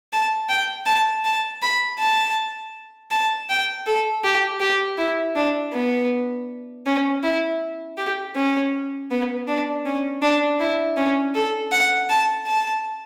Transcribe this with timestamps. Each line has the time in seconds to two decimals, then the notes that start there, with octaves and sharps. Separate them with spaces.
0.13 A5
0.49 G5
0.86 A5
1.25 A5
1.62 B5
1.99 A5
3.11 A5
3.49 G5
3.87 A4
4.24 G4
4.61 G4
4.98 E4
5.35 D4
5.73 B3
6.86 C#4
7.23 E4
7.97 G4
8.36 C#4
9.11 B3
9.48 D4
9.86 C#4
10.22 D4
10.60 E4
10.97 C#4
11.35 A4
11.72 F#5
12.09 A5
12.47 A5